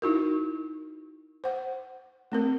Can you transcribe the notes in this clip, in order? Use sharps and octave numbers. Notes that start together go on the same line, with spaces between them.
D#4 E4 F#4 A#4
C5 F#5
A3 C4 A#4